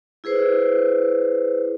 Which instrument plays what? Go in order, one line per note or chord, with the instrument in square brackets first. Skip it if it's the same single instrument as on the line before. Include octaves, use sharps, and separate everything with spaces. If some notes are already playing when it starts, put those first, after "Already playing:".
[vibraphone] E4 G#4 B4 C5